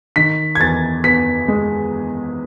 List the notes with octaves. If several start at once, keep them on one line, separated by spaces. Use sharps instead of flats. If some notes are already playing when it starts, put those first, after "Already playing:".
D#3 B6
G#6
E2 A6
B3 B6
G#3